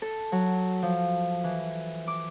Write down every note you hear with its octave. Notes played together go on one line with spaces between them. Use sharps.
A4
F#3
F3
E3
D6